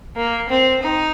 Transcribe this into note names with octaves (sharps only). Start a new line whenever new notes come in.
A#3
C4
D#4